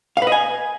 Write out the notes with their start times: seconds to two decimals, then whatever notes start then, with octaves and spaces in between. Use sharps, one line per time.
0.17 F5
0.22 B4
0.27 D#5
0.32 G#5